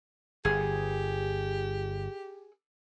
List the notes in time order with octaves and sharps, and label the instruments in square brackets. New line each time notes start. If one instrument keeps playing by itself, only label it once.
[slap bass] G1 [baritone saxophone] G4 [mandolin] G#4